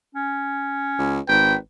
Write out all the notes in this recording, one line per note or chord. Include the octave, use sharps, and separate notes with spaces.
C#4
C#2
G#1 B4 G5